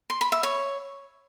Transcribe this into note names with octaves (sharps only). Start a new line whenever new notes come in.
C6
B5
E5
C#5